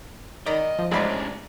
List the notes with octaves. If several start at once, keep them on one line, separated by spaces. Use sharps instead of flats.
D#3 D5 D#5 A#5 B5
F3
A1 G#3 C#4 D4 G#4 C5 D5 B5